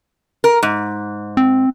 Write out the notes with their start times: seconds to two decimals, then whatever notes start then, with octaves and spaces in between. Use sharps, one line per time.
0.44 A#4
0.63 G#2
1.37 C4